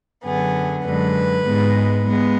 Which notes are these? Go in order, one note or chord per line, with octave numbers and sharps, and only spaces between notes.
F#2 D3 F#3 B3 G#4
F#2 D3 G#3 B4
G#2 G#3 B3
G#3 B3